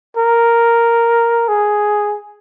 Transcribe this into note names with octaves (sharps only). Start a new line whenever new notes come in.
A#4
G#4